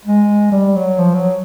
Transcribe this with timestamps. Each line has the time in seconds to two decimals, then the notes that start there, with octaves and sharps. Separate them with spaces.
0.05 G#3
0.52 G3
0.75 F#3
0.99 F3
1.14 F#3